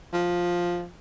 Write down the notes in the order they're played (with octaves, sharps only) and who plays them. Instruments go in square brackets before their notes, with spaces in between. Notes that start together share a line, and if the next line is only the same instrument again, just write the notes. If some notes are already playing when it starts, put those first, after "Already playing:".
[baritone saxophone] F3